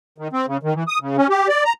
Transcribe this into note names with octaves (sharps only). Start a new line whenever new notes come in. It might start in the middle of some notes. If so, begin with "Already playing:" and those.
D#3
C4
C#3
D#3
E3
D#6
C#3
C#4
G4
D5
A#5